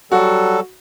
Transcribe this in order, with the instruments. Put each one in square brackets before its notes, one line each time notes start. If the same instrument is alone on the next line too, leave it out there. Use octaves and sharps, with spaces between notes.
[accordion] F#3 G3 A4 [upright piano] F#4